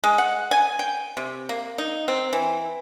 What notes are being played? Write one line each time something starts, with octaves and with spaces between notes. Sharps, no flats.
G#3
F#5
G#5
G5
C3
A#3
D#4
C4
E3